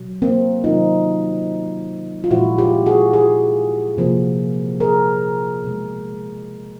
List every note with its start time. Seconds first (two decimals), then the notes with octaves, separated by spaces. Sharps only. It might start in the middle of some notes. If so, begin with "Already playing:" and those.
Already playing: B2 F#3
0.22 A#3 C4
0.64 C3 D#3 F#3 A#3 D#4 F4
2.24 F4
2.31 A#2 F3 G#3 E4 F#4
2.58 F4 G4
2.86 F#4 G#4
3.13 F#4 G#4
3.97 C3 F3 A#3
4.80 G#4 A#4
5.64 B2 G#3